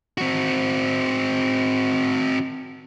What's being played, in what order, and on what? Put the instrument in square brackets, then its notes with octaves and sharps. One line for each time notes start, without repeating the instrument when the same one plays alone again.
[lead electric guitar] C4 F#4